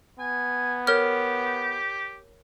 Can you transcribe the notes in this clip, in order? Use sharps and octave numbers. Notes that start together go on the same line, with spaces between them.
B3 G#5
G4 A#4 C#5 F6